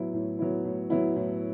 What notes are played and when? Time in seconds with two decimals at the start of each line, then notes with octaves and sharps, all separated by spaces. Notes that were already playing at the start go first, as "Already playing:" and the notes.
Already playing: A2 F#3 B3 E4
0.13 A2
0.39 F#3 B3 E4
0.65 A2
0.90 F#3 B3 E4
1.16 A2